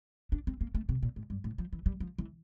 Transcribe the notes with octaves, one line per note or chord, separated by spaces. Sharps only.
D4
C4
A#3
A3
C3
A#2
A2
G2
A2
F3
E3
G3
F3
E3